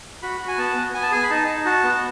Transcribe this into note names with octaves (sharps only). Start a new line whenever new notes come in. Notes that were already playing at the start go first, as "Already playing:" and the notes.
F#4 B5
F#4
G#5
B3 A5
B3
B3 G#5
A5
G#4 G#5
B5
D#4 A5
D#4
F#4 A5
B3